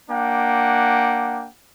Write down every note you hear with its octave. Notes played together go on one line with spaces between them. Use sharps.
A#3 D4 F#5 G5